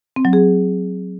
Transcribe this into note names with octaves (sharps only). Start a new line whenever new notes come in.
C4
F#3
G#4